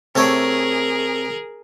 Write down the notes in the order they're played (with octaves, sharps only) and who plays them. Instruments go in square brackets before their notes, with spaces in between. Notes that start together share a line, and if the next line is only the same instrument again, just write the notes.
[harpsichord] C3 A3 C#5 [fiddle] G#4 A#4